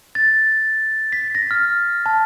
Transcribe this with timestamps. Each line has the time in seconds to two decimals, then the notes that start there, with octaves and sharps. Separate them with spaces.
0.15 A6
1.12 B6
1.35 A#6
1.51 F6
2.06 A5